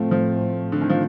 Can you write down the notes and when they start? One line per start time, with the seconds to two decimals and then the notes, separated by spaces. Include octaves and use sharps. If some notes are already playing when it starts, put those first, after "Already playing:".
Already playing: A2 F3 A3 C4
0.11 F3
0.72 D3
0.81 D#3
0.90 F3